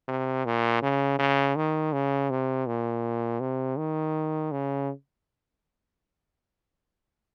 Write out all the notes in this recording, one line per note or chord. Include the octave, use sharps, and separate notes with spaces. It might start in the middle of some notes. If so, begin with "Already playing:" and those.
C3
A#2
C#3
C#3
D#3
C#3
C3
A#2
C3
D#3
C#3